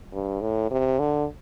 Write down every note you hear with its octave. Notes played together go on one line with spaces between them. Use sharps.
G2
A2
C3
D3